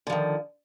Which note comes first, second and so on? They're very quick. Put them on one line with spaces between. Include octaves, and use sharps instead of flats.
D3 F3 D#3